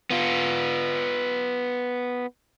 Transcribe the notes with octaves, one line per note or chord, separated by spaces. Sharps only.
B3 F4